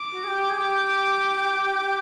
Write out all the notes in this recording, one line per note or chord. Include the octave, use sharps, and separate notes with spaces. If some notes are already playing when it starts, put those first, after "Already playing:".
Already playing: D6
F#4
G#4
G4
G#4
G4